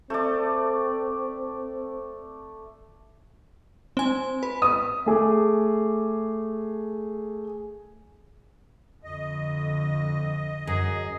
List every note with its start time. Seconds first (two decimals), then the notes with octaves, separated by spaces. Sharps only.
0.10 A3 C4 D5
3.97 C4 G#5
4.43 B4
4.62 D#6
5.06 A3 G#4 D6
9.04 F2 D3 D#5
10.67 F#2 G#4